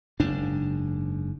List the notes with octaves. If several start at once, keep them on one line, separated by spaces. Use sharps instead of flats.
F#1 G#2 D4